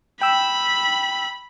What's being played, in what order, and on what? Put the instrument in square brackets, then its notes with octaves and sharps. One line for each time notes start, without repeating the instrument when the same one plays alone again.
[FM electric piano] G5 E6 [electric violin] B5